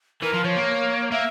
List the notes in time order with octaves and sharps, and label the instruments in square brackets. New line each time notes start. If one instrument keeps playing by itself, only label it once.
[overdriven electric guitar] E3 [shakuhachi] A#4
[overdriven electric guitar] F3
[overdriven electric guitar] F3 [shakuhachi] C#5
[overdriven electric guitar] A#3
[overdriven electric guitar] A#3 [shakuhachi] E5